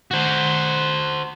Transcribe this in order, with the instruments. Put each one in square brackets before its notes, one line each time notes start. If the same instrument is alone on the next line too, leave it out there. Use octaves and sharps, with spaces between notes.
[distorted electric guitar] F#4 C5